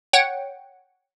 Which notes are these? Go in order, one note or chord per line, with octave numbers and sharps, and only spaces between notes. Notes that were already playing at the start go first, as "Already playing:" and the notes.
C#5 F#5 G5